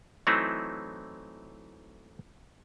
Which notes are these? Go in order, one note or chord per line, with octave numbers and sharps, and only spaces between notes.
E3 F#3 A3 C4 D#4 E4